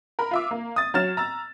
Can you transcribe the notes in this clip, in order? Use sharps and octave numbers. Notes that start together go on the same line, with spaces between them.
A#4 B5
F4 E5 D6
A#3
D#6 A6
F#3 C#4 F6 A6 E7
A#5 E6 A6